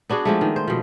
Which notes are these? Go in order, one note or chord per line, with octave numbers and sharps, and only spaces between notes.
B3 D4 F#4 G#4
F3 G#3 A3
D#3
C5
B2 F3